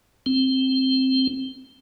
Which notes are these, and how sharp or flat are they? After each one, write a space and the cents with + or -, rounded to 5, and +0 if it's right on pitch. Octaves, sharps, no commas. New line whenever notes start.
C4 +5